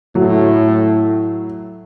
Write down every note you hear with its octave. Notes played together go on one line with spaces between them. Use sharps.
A2 F#3